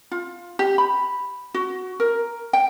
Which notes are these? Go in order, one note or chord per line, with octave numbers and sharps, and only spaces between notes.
F4
G4
B5
F#4
A#4
G5